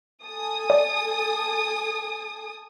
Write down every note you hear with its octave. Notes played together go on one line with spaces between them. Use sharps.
A4 G#5 D#6
D5